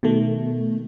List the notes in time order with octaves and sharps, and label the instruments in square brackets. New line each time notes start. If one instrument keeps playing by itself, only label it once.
[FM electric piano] B2 D#3 A3